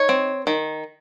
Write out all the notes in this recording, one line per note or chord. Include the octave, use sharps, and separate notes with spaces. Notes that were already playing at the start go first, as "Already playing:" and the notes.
Already playing: D#4 C#5
C4
D#3